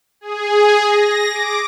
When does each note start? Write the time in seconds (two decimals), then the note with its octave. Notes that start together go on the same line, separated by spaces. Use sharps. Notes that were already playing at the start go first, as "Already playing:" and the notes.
0.21 G#4
0.86 A#6
1.29 D6